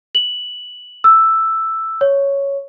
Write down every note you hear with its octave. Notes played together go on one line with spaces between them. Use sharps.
F#7
E6
C#5